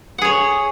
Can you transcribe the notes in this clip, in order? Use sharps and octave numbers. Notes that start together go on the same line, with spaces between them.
G#4 C#5 F#5